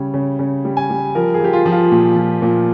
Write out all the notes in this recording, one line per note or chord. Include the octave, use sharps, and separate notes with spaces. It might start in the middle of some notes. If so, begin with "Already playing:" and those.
Already playing: C#3 G3 C#5
C#3
C#3
G3
G#5
G3
F3 A#4
G#4
F3 G4
F4
F3
F4
A#2
F3
A#2